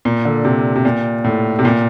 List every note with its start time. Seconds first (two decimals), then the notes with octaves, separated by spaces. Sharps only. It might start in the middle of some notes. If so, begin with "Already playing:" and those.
0.05 A#2
0.25 D3
0.45 C3
0.76 C3
0.85 A#2
1.24 A2
1.59 C3
1.65 A#2